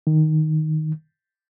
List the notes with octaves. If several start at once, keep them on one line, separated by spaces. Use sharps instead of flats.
D#3